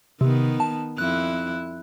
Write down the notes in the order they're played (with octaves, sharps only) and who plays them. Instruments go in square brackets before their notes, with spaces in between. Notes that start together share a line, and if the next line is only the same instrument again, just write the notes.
[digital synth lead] C3 [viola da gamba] D#3 B3
[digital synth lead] A5
[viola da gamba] F2 E4 [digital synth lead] F#6